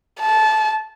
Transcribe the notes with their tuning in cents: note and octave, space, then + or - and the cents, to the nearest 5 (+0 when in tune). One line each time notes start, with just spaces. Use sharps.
A5 -20